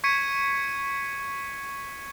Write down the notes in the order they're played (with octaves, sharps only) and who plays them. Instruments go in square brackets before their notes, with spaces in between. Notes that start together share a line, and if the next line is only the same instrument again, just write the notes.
[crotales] C#6 G#6 B6 C#7 D#7